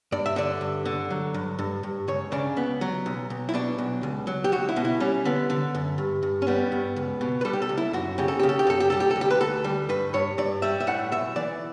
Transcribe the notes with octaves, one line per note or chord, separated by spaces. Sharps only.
G2 D5
E5
D3 D5
G2
D3
F#3
G2
G2
G2
C#2 C#5
C#3 D4
C#2 B3
F#3
B1
B1
E4
B2 D4
B1
C#2
F#3
G4
C#2 F#4
E4
B2
E4
G3 C#4
D3 B3
D3
F#2
G2
G2
C#4
G3 B3
G2
C#2
B2
B4
G3 A4
G4
A4
C#2
E4
F#2 F#4
C#3 G4
A4
C#3 G4
A4
G4
F#2 A4
G4
G3 A4
G4
A4
D2
G4
B4
D2 A4
G3
G2 B4
G2 C#5
G2 D5
G3 E5
E5
A2 F#5
B1 E5
E3 D5